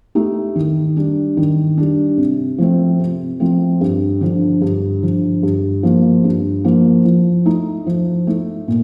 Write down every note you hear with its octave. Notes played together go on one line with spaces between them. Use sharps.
A3 D#4 G4
D#3
G3 D4
D#3
G3 D4
C3
F3 A3 C4
C3
F3 A3 C4
G2
D3 F3
G2
D3 F3
G2
F3 A#3
G2
F3 A#3
F3
A3 D#4
F3
A3 D#4
A#2